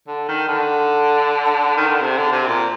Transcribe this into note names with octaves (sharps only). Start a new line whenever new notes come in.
D3
D#3
D3
D#3
D3
C3
D3
C3
A#2